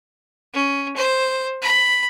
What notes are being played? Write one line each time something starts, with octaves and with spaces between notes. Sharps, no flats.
C#4
C5
B5